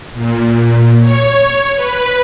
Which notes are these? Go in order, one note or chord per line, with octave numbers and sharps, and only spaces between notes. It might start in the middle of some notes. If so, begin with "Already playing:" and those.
A#2
C#5
B4